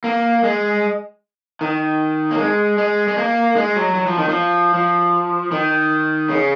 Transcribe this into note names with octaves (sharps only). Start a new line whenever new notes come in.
A#3
G#3
D#3
A#3
G#3
G#3
G#3
A#3
G#3
F#3
F#3
F3
D#3
F3
F3
D#3
C#3